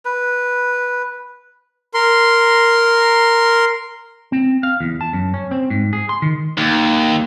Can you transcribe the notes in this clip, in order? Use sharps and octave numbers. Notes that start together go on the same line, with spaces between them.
B4
A#4 C6
C4
F5
E2
A5
F#2
C#4
C4
G#2
G#4
C6
D#3
D#2